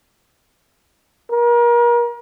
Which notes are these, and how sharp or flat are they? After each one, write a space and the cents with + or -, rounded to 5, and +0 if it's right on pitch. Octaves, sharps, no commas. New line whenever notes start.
A#4 +35